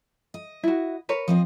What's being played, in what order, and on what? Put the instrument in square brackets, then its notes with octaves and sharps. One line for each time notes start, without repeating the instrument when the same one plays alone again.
[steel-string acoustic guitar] D#5
[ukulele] E4 F#4
A#4 B4 C#5
[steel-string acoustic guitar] F3 C4 D#5